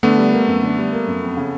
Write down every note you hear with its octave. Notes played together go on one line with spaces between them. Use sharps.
D3 A3 B3
G3
A#3
F#2
D3
G3
A#3
F#2
F2
C#3